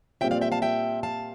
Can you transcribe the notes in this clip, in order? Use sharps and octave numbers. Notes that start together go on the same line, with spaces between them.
A#2 G3 C4 F4 E5 G5
D5 F5
E5 G5
F5 A5
E5 G5
F5 A5